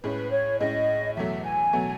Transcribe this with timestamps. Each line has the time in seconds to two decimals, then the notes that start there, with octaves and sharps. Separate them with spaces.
0.03 A2 G#3 C#4 B4
0.31 C#5
0.60 A2 G#3 C#4 D#5
1.17 E2 B2 F#3 A3 E5
1.44 G#5
1.73 B2 F#3 A3